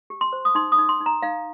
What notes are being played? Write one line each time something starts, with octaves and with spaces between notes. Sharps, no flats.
G4
C6
C5
D#6
D#4 C6
D#6
D#4
C6
D#4
A#5
D#4 F5